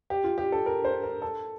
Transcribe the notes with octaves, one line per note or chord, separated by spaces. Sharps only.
G4
F4
G4
A4
A#4
C5
A#4
A4